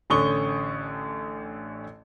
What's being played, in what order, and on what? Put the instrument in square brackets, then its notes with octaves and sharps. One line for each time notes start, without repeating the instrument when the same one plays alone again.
[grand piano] A1 D3 C#4 C#6 D#6 G7